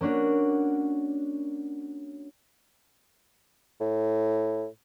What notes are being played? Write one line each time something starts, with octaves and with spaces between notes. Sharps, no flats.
A#3 C#4 D4 F#4
A2